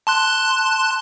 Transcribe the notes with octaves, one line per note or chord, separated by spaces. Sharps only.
A5 C6 F#6